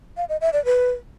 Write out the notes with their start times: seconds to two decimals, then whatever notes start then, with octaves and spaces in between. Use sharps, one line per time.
0.17 F5
0.29 D#5
0.41 E5
0.53 D5
0.65 B4